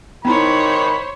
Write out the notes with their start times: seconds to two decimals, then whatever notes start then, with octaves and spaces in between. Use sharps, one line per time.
0.25 D#3 B3 D#4 E4 C5 C#5 B5